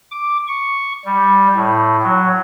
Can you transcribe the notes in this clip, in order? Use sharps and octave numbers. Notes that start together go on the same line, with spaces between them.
D6
C#6
G3
A2
F#3